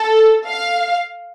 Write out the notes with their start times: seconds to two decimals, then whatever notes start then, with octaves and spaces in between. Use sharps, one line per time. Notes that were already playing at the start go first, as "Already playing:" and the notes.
Already playing: A4
0.45 F5